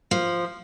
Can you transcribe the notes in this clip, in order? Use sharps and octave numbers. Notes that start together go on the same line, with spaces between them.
F3